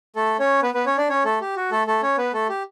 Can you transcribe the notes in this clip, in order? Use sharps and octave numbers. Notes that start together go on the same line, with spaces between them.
A3 A4
C#4 C#5
B3 B4
B3 B4
C#4 C#5
D4 D5
C#4 C#5
A3 A4
G4
F#4
A3 A4
A3 A4
C#4 C#5
B3 B4
A3 A4
G4